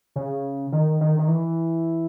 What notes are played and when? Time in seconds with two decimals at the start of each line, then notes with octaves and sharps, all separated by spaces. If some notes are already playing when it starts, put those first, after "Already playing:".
0.16 C#3
0.72 D#3
1.01 D#3
1.19 D#3
1.28 E3